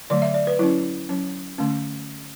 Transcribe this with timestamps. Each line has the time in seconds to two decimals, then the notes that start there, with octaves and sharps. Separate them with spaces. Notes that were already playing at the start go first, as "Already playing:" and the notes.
0.10 D3 F#3 A3 D5
0.22 E5
0.34 D5
0.47 B4
0.59 F#3 C#4 E4
1.09 F#3 C#4
1.58 D3 A3 C#4